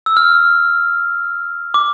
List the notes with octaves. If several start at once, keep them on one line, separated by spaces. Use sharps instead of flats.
E6
F6
D6